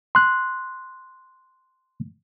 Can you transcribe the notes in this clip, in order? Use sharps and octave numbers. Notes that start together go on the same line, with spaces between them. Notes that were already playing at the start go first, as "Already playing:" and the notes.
C6 F#6